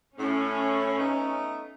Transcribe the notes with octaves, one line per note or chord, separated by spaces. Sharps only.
A2 C#4
A3 B3 D#4